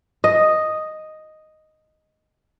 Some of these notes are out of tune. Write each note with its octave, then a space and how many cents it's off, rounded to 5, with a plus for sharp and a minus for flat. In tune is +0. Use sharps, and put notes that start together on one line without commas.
D#5 +0